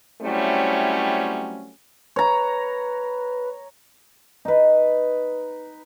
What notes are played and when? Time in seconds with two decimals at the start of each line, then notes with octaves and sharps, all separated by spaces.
0.22 F#3 G3 A3 C4 C#4 E4
2.16 B4 C#5 A#5
4.45 D#4 B4